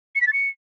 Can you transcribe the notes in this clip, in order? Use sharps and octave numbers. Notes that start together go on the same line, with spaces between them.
C#7
B6
A6
C#7